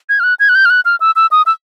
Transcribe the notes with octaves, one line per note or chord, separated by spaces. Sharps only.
G#6
F6
F#6
G#6
F#6
G6
F6
F#6
F6
E6
E6
D#6
E6